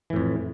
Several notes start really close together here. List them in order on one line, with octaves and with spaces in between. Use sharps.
E3 A2 F2